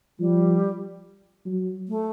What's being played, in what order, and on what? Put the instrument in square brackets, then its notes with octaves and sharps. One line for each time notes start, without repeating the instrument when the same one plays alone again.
[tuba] F3 [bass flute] G3
[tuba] F#3
[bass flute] A3